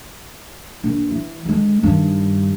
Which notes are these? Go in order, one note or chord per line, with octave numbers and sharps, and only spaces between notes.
A#1
E3
D3 G#3
G2 D#3